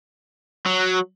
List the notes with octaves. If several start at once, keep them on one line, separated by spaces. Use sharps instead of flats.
F#3